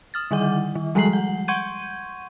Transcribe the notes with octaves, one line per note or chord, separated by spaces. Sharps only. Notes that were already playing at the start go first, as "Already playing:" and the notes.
D#6 F6 A6
D3 D#3 G3 F#5 D6
D#3
F3 G3 G#3 A#5 C7 F#7
F#5
F#5 C6 C#6 G6 G#6 D#7